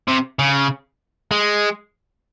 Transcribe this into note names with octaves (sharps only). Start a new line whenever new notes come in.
C3
C#3
G#3